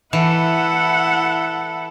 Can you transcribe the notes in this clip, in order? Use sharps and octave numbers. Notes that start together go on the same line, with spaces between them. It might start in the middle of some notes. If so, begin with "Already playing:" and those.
E3 E4 A4 F#5